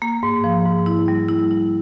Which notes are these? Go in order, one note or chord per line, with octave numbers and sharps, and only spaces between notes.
A#3
G#2
F3
G#2
E4
G3
E4
E4